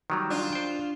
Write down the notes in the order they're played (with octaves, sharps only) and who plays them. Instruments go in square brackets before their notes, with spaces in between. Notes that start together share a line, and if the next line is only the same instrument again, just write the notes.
[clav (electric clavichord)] D#3 F#3 G3
[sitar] D4 F4
[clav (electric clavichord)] C5 G5